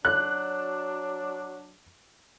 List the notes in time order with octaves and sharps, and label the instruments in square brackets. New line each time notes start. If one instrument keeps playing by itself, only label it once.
[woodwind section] F#3 D4 [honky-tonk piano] F#6